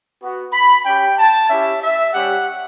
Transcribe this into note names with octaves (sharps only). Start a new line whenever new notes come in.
B3 F#4
B5
C#4 G4 G5
A5
C#4 E4 G4 E5
E5
G3 C#4 G4 F#5